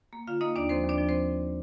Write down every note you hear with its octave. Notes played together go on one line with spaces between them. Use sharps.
A#3
D3 F4 F5
A#3 D#4 D#5
D#2 D4 D5
F3 C4 C5
D#2 D4 D5
F3
C4 C5